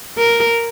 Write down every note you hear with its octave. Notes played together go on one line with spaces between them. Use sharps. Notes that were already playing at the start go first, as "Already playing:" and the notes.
A#4